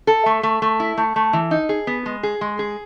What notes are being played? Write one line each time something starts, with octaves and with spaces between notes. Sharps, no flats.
A4
A3
A3
A3
E4
A3
A3
E3
D#4
G#4
B3
G#3
G#4
G#3
G#4